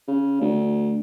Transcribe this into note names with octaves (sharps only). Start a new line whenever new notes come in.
C#3
D2